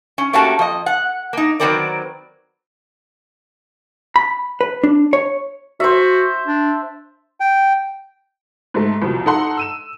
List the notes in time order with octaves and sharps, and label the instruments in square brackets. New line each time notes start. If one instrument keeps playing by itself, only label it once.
[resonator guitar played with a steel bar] C#4
A3 A#3 C#4 F#4 G4 A5
F2 D#5
F#5
A#3 D#4
D#3 F#3 B3 C4 A#4 D5
[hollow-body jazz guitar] B5
B4
D4
C#5
[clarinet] F#4 [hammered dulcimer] C5 E5
[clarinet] D4
[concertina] G5
[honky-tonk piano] G#2 A3
C2 F2 B2
D#4 A4 F#5 C6
E6 D#7 E7